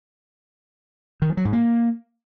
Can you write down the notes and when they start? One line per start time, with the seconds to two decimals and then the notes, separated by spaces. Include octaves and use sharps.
1.22 D#3
1.29 F3
1.37 F#3
1.45 G#2
1.53 A#3